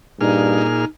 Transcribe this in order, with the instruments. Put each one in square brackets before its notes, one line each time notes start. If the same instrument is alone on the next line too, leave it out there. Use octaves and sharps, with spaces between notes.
[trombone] G2 [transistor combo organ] A#2 G#4 F6 [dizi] D#4